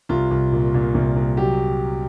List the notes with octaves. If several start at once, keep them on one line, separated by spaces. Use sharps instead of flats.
C2 F4
C2
A#2
A#2
C2
C2
F#3 G4